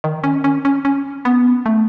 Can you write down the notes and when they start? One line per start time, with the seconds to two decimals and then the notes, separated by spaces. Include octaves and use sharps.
0.04 D#3
0.24 C#4
0.44 C#4
0.65 C#4
0.85 C#4
1.25 B3
1.66 A3